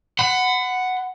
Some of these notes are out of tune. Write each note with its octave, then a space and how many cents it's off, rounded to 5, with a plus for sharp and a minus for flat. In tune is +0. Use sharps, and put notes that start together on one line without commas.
F#5 +0 B5 +35